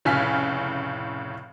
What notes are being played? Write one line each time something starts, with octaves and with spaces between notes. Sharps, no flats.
F1 A2 C#3 G#5 F6 B6